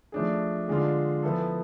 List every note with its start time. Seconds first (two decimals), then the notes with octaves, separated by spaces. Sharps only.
0.12 F3 A3 D4 G#4
0.68 D3 G#3 D4 F4
1.23 F3 B3 E4 A4